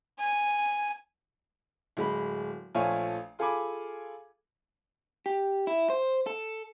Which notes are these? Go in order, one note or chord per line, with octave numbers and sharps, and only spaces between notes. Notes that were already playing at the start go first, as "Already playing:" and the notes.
G#5
D1 G#3 B5
A#1 F3 A3 C#5 F5 G#5
F4 G#4 A4 G#5 B5 D6
G4
E4
C5
A4